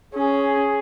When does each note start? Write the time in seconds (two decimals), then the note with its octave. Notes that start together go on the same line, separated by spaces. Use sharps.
0.14 C#4 G#4